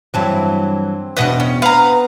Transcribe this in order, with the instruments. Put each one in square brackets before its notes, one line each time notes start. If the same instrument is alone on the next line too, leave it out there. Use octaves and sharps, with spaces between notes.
[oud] G2 E3 F#3 [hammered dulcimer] C4 A5
[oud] E2 B2 D4 [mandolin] B4 D#5 F#5
[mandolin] C#4
[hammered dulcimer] B3 [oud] B4 [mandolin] F5 A#5